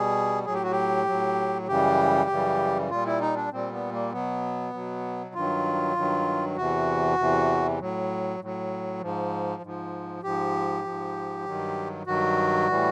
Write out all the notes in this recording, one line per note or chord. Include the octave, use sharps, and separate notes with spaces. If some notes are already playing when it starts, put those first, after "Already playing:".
Already playing: B2 G3 G#4
A2 F#3 G#4
G4
F#4
G4
A2 F#3
F#2 C#3 E3 G3 G4
F#2 C#3 E3 G3
A#2 G3 F4
E4
D#4
D4
A#2 G3 C4
B3
A#3
B2 F#3 B3
B2 F#3
G2 D#3 F#3 F4
G2 D#3 F#3
E2 C3 E3 F#4
E2 C3 E3
A2 F#3
A2 F#3
G#2 F3
G#2 F3
G#2 F3 G4
G#2 F3
G2 D#3 F#3
G2 D#3 F#3 F#4
A2 E3 G3